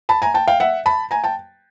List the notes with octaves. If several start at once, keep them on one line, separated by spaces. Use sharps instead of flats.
A5 B5
G#5 A#5
G5 A5
F5 G5
E5 F#5
A5 B5
G#5 A#5
G5 A5